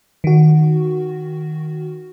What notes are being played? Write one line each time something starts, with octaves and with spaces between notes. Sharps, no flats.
D#3 F#4